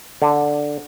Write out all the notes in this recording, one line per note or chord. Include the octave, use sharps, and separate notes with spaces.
D3